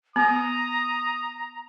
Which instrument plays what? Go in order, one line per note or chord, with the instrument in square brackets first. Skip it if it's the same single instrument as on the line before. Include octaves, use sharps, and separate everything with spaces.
[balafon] B3 [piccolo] A#5 [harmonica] D#6